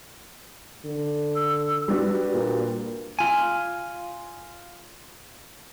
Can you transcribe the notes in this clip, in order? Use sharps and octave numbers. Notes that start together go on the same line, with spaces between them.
D3
E6
G3 D4 F#4 B4
A#2
F4 G#5